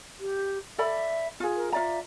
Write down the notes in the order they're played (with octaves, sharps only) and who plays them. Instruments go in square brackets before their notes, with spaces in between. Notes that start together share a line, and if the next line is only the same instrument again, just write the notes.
[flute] G4
[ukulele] A4 D5 B5 [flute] E5
[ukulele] F4 G#4
[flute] A#4
[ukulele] F4 D5 A#5 [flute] E5